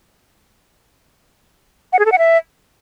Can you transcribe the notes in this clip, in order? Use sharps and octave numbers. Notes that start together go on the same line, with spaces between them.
F#5
G#4
A4
F#5
E5